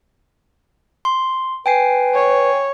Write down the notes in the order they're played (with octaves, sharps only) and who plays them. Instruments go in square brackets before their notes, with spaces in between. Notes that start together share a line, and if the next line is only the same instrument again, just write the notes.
[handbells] C6
[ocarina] B4 [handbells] G5 G#5 C7
[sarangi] C#5